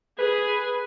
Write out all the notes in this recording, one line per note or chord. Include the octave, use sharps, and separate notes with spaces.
G#4 B4